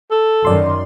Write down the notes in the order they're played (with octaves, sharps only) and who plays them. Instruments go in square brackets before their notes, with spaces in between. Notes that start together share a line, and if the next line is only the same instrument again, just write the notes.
[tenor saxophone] A4
[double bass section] F#2 D#3 [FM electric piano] D5 C6